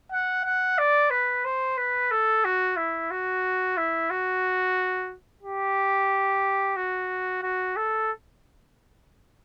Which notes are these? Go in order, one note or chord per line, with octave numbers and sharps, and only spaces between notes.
F#5
F#5
D5
B4
C5
B4
A4
F#4
E4
F#4
E4
F#4
G4
F#4
F#4
A4